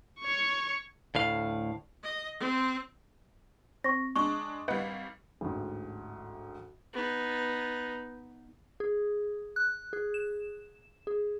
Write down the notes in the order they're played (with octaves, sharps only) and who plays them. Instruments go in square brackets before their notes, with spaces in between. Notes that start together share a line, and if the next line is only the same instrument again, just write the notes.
[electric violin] C#5 C#6
[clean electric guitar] D2 A2 F5
[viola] D#5
C4
[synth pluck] C4 [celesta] C#6 A#6
[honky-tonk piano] G#3 D4 D#5 [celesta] C#6
[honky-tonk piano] G#1 G3 [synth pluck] B4 D#5 F#5
[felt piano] A1 D2 G#2
[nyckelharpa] B3 D#4
[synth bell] G#4
F#6
G#4
E7
G#4